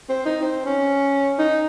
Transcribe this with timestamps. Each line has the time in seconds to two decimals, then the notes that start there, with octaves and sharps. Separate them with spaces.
0.09 C4
0.25 D#4
0.42 C4
0.66 C#4
1.38 D#4